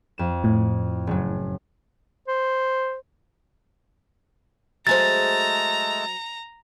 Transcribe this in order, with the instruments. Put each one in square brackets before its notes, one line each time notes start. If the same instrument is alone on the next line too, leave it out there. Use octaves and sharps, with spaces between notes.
[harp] F2 E7
[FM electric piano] A2
[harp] F#1 F#3
[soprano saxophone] C5
[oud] F#3 G#4 C5 [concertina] G#3 A3 E6 [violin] A#5 [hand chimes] A6